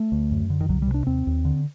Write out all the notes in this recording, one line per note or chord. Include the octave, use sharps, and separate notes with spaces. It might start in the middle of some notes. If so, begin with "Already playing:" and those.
Already playing: A3
D2
F#2
D3
D#3
C2 F#3
G3
C3
D4
D#2 C4
D#2
D3